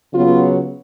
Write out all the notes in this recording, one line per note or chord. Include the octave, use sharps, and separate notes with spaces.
C#3 F#3 B3 F4